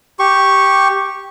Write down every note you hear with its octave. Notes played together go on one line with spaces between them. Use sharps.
G4 C#6